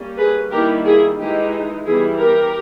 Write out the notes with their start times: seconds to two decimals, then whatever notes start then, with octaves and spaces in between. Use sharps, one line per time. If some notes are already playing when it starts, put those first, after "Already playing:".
Already playing: G3 A#3 C#4
0.18 G#4 B4
0.51 D#3 G3 A#3 E4 G4 A#4
0.85 E4 G#4
1.18 E3 G#3 D#4 G4
1.85 E3 G3 B3 E4 G#4
2.18 G4 A#4